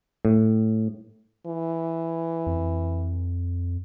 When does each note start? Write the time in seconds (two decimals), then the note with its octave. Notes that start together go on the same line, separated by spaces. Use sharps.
0.25 A2
1.47 E3
2.47 F2